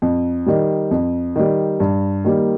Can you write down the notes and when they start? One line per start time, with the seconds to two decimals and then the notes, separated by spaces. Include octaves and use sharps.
0.02 F2
0.46 D#3 G3
0.91 F2
1.36 D#3 G3
1.80 G2
2.25 D#3 G3 A#3